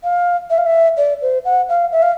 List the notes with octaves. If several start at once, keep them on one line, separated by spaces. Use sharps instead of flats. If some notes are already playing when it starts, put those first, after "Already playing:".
F5
E5
F5
E5
D5
C5
F#5
F5
E5
F5